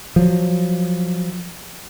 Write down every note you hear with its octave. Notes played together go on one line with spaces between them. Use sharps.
F3 F#3